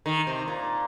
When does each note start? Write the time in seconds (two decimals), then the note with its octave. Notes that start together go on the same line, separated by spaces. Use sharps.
0.06 D#3
0.27 C3
0.48 A#2